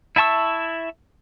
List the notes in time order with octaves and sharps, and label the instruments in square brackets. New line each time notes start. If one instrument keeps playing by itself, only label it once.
[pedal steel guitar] E4 E5 A5 C#6 E6